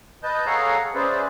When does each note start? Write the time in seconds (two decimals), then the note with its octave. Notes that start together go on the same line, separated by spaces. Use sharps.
0.23 B4 D#5 A5 G6
0.46 G#4 A4 C#5 F5 F#5 A#5
0.95 C#4 G#4 B4 C5 D5 E5